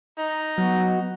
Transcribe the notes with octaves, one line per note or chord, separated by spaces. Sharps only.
D#4
F#3 B3 F#4